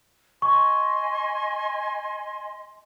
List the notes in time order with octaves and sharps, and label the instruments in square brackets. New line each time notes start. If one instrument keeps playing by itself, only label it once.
[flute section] D#5 G#5 C6 [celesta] C#6